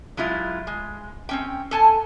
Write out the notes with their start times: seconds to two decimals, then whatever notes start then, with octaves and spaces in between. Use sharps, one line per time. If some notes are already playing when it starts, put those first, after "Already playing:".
0.17 F#3 G#3 E4 F4
0.67 G#3
1.29 C4 C#4 G5
1.71 A4 G#5 A5